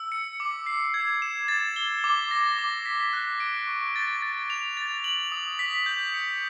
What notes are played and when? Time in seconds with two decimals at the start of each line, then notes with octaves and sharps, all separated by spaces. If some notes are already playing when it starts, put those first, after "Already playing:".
Already playing: E6
0.12 C#7
0.40 D6
0.66 C7
0.94 G#6
1.22 E7
1.48 A6
1.76 G7
2.04 D6
2.31 A#6
2.58 D6
2.86 B6
3.13 F#6
3.40 D7
3.67 C#6
3.96 A6
4.22 A6
4.50 F7
4.77 A6
5.04 F#7
5.32 D#6
5.59 B6
5.86 G6
6.14 C#7